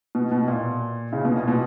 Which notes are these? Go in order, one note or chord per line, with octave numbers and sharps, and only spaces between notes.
B2
B2
A#2
C#3
B2
A#2
B2